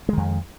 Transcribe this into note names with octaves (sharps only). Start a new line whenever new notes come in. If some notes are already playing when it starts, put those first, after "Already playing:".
F2 D#3 G#3